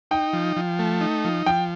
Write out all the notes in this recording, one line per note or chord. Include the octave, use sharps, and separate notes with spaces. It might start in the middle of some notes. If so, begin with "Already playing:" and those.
D#4 G5
F3
F3
A3
D#4
F3
F3 G5